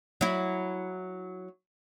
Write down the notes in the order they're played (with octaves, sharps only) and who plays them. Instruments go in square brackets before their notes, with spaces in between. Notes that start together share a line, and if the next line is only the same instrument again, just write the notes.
[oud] F#3 E4